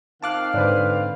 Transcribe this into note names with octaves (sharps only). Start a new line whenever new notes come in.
D#3 C4 F5 A5 D6 F#6
G#2 D3 B4 C5 D5